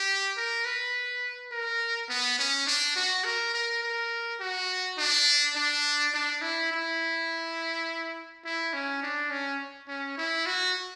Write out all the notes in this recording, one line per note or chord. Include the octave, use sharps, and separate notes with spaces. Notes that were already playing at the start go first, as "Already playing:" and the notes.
Already playing: G4
A#4
B4
A#4
B3
C#4
D4
F#4
A#4
A#4
A#4
F#4
D4
D4
D4
E4
E4
E4
C#4
D4
C#4
C#4
E4
F#4